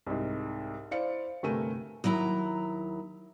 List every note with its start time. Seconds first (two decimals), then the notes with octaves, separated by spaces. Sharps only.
0.06 C2 G#2
0.91 E4 C5 D5 F5 C#7
1.43 G1 C3 A3 A#4 G#5 D#7
2.04 D#2 F#3 E4 A#5